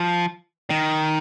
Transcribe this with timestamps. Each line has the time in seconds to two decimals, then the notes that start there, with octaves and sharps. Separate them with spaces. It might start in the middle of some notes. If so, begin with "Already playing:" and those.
Already playing: F3
0.70 D#3